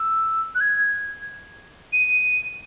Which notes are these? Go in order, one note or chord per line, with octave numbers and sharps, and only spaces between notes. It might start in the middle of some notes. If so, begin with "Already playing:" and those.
Already playing: E6
F#6
G#6
D#7